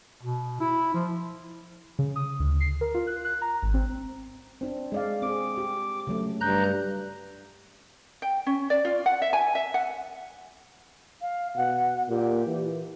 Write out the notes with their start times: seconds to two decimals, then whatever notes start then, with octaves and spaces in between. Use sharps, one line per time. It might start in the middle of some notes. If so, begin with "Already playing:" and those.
0.23 B2
0.60 E4
0.94 F3
1.99 C#3
2.16 D#6
2.40 D2
2.60 C7
2.81 A#4
2.94 F4
3.07 F#6
3.25 F#6
3.42 A#5
3.62 G#1
3.74 C4
4.61 C4 D4
4.92 G#3 D5 F5
5.22 C4 G#4 D6
5.58 G4
6.07 C#3 F#3 A3
6.41 G2 A#5 F#6 G6
8.22 G5
8.47 C#4
8.70 D5
8.85 F4
9.06 F#5
9.22 E5
9.33 G#5
9.55 E5
9.74 F#5
11.21 F5
11.56 B2 F#5
12.09 A#2 G4
12.46 E3